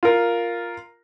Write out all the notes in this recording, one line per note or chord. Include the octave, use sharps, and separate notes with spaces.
F4 A#4